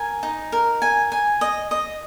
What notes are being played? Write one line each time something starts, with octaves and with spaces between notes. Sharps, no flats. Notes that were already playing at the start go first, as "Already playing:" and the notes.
Already playing: A#4 G#5
D#4
A#4
G#5
G#5
D#5
D#5